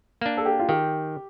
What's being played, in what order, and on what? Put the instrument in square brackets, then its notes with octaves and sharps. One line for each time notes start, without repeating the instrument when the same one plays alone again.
[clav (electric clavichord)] A#3 D4
[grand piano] A4
G4
F4
[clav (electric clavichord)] D#3 [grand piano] G4